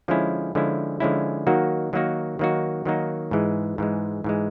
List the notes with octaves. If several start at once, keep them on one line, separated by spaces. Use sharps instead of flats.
D3 F3 G#3 C#4 E4
D3 F3 G#3 C#4 E4
D3 F3 G#3 C#4 E4
D#3 F#3 A#3 D#4 F#4
D#3 F#3 A#3 D#4 F#4
D#3 F#3 A#3 D#4 F#4
D#3 F#3 A#3 D#4 F#4
G#2 E3 G#3
G#2 E3 G#3
G#2 E3 G#3